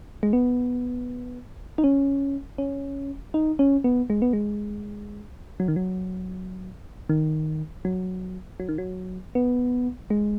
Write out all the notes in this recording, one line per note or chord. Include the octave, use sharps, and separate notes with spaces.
G#3
B3
D#4
C#4
C#4
D#4
C#4
B3
G#3
B3
G#3
F#3
D#3
F#3
D#3
F#3
F#3
D#3
F#3
B3
G#3